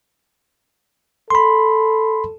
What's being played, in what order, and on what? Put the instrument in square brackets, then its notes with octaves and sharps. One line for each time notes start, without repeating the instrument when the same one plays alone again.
[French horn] A4 [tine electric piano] B5 C6